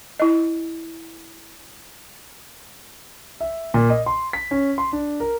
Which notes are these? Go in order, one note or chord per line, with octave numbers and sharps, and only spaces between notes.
E4 D#5
E5
A#2
D#5
C6
B6
C#4
C6
D4
A#4